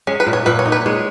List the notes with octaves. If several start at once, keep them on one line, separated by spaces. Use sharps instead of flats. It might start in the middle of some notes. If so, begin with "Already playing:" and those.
G#3 C#4
B4
A#2
C#5
A#2 B4
C#5
D#4
B4
G#3 C#5